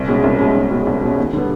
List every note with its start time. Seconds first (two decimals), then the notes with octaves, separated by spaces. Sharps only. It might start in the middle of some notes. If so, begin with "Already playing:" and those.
Already playing: C2
0.08 B2 G#3 C#4
0.24 C2
0.39 B2 G#3 C#4
0.55 C2
0.70 B2 G#3 C#4
0.87 C2
1.02 B2 G#3 C#4
1.17 D#2
1.33 D3 G3 B3